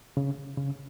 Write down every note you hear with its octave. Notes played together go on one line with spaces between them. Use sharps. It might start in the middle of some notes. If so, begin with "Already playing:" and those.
C#3
C#3